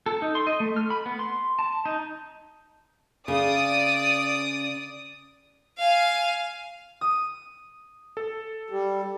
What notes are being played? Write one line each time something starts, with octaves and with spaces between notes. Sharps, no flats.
A4
D#4
C6
D#5
A3
F6
B5
B3
C6
A5
D#4
C#3 D5 D#6
F5 G#5
D#6
A4
G3